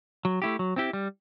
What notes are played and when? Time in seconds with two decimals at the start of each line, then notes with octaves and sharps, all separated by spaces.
0.25 F#3
0.42 A3 E4 G4
0.59 F#3
0.76 C4 E4 G4
0.93 G3